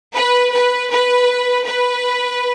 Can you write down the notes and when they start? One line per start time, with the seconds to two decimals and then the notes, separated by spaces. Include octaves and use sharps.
0.15 B4
0.53 B4
0.91 B4
1.65 B4